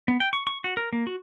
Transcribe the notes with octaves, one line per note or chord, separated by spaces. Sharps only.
B3
G5
C#6
C#6
F#4
A#4
A#3
F#4